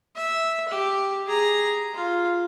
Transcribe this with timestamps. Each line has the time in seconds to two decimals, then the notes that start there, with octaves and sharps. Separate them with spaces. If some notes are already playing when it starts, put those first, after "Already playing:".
0.16 E5
0.69 G4
1.27 G#4 A#5
1.94 F4